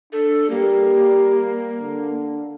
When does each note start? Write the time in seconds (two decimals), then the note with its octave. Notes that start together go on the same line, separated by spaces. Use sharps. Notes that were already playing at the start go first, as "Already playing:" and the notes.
0.12 D4 A4
0.50 G3 A#3
1.80 D3